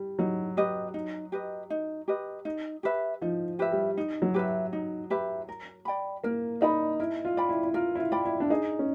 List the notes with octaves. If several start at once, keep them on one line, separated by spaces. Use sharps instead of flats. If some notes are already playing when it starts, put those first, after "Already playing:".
Already playing: G3
F#3 D#4
G4 B4 D#5
D#4
G4 B4 D#5
D#4
G4 B4 D#5
D#4
G4 B4 E5
F3 D#4
G4 B4 E5
G3
D#4
F#3
G4 B4 E5
D#4
G4 B4 E5
A#4
D5 G5 B5
A#3 A#4
D#4 D5 G5 B5
E4 A#4
F4
D5 G5 B5
E4
E4
F4 A#4
E4
F4
D5 G5 B5
E4
D4
D#4 G#4
C#4